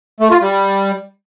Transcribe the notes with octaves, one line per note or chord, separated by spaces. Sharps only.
A3
F4
G3